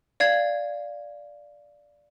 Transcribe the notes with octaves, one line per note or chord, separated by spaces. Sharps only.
D5 F5 G#6